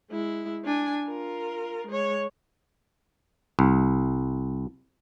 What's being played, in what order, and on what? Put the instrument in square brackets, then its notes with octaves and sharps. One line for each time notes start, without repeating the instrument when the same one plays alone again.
[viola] G#3 E4
D4 G#5
F4 A#4
G#3 C#5
[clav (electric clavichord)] C2